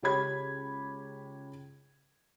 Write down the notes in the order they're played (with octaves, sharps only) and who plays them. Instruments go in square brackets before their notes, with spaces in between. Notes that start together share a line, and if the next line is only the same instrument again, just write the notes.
[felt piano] C#2 G4 C#5 B5 G#6